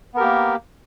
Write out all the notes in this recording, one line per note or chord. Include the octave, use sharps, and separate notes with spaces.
A#3 B3 G4 A#4